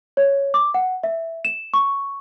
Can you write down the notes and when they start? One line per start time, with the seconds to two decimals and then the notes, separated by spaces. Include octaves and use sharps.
0.17 C#5
0.54 D6
0.74 F#5
1.03 E5
1.45 E7
1.74 C#6